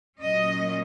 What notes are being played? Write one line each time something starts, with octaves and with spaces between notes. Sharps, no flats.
A#2 F#3 C#4 D#5